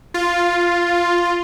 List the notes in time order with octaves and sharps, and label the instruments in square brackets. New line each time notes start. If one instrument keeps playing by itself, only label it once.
[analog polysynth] F4